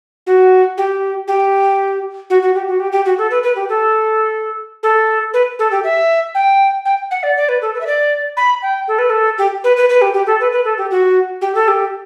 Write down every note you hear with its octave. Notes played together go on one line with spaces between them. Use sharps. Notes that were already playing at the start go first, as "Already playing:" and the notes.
F#4
G4
G4
F#4
F#4
G4
F#4
G4
G4
F#4
A4
B4
B4
G4
A4
A4
B4
A4
G4
E5
G5
G5
F#5
D5
D5
B4
A4
B4
E5
D5
B5
G5
A4
B4
A4
G4
B4
B4
B4
G4
G4
A4
B4
B4
A4
G4
F#4
G4
A4
G4